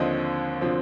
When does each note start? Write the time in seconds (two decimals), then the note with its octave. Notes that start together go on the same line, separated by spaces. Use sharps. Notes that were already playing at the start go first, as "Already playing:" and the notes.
Already playing: D#2 D3 F3 C4 D#5
0.61 D3 F3 C4